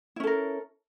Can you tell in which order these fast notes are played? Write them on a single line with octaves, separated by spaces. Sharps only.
E4 C#4 A4 A#4